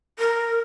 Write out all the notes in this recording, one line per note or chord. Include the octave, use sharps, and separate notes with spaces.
A#4